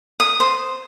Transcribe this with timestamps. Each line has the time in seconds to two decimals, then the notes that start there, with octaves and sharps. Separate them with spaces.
0.20 D#6
0.40 C5